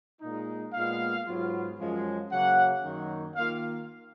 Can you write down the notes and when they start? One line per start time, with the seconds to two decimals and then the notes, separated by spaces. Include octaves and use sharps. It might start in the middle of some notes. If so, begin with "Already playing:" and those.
0.21 A#2 G#3 D#4
0.73 A#2 G#3 B3 F4 F5
1.26 G#2 F#3 B3 F4
1.78 F#2 F3 G#3 C#4
2.31 C#3 F#3 A#3 F#5
2.83 F#2 D#3 F#3 A#3 D#4
3.35 D#3 A#3 F4 F5